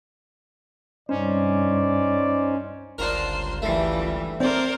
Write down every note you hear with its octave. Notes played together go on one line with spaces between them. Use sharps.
C2 G2 C#4 D#4 C5 D5
G1 C#2 D4 F4 A#4 C5
E3 G3 A3
C4 A#4 C5 D5